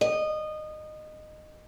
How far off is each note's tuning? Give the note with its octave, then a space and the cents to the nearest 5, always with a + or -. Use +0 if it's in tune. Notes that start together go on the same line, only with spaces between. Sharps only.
D#5 -20